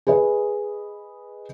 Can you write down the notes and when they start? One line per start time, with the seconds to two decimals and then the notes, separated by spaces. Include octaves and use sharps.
0.07 G#4 B4 D#5